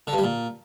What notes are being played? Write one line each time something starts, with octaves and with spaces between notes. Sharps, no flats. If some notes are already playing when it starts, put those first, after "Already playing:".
D3
G2
G3
A#2